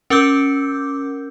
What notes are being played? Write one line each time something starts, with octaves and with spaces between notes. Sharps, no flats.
C#4 A#4 D6 E6 G6